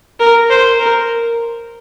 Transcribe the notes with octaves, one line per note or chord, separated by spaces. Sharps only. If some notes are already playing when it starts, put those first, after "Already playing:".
A#4
C5
A#4